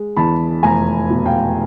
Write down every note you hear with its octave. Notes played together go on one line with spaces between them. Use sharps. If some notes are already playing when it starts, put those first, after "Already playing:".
Already playing: G#3
E2 A5 B5
F1 G#5 A#5
B2
F5 G5